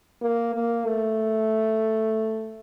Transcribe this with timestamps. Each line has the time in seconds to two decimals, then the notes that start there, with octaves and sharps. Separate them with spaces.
0.22 A#3
0.54 A#3
0.87 A3